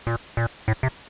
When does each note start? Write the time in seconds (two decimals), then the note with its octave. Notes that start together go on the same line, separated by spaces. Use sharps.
0.07 A#2
0.37 A#2
0.68 A2
0.83 C3